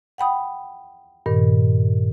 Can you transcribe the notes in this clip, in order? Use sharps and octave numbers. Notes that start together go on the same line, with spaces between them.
F#5 G5 B5 D#6
G2 A#2 D#3